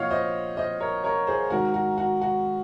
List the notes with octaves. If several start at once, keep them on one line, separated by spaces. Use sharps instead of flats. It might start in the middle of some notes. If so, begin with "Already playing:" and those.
Already playing: A#2 F3 C#5 D#5 F5 F#5
C5 D#5
C5 D#5
A#4 C#5
A#4 C#5
G#4 C5
G#2 D#3 F#4 A#4
F#4
F#4
F#4